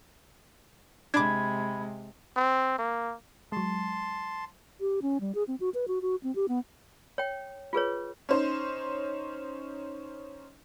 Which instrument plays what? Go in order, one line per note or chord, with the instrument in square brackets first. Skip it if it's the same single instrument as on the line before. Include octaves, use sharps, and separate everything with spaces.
[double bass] C3 G#3 [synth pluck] D4 D6 [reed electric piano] B5 G#6
[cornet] C4
A#3
[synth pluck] F#3 G#3 [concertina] A5 C6
[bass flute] G4
C#4
G3
G#4
C4
F#4
B4
F#4
F#4
C4
G4
B3
[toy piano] C#5 G5
F4 G#4 B4 C#5
[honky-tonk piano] C#4 D#4 C5